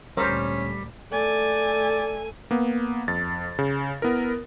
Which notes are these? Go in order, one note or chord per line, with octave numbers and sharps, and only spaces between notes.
D2 A#2 G3 C#4 A#4 C5
A3 D5 G#5
A#3 B3
F2 A6
C#3
B3 E4 A#4